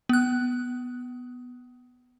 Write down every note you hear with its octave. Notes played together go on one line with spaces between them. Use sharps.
B3 F#6